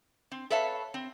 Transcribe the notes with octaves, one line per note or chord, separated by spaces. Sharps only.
C4
A4 B4 C#5 E5 F5 A5
C4